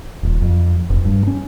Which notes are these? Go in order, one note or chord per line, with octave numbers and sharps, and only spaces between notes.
D#1
F2
F1
G2
C#4